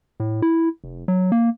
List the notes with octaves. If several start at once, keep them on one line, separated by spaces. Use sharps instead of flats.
A2
E4
F1
F#3
A#3